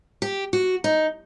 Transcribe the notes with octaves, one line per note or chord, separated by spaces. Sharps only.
G4
F#4
D#4